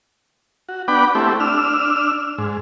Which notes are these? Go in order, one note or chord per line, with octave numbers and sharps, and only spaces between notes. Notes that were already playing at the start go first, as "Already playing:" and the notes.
F#4
B3 D4 F#5 G5 B5 D6
A3 C4 E4 G4
D4 E6 F6
G#2